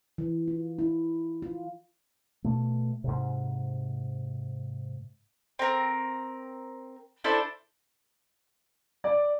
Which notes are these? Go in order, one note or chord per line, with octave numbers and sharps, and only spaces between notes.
E3
F4
E4
F4
B2 A3
G#2 C3
C4 A#4
D4 E4 A4 C5
D5